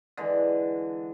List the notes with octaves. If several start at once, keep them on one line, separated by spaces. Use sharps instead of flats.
D3 E3 G#3